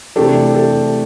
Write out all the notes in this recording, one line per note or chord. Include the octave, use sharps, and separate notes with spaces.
C3 E3 A3 D4 G4 A4
G4 A4